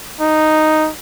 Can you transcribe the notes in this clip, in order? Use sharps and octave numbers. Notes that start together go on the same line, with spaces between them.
D#4